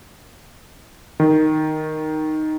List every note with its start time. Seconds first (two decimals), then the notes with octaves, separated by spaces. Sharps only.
1.20 D#3